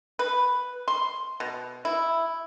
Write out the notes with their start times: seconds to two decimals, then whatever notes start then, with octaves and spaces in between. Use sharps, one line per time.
0.19 B4
0.88 C6
1.40 B2
1.85 E4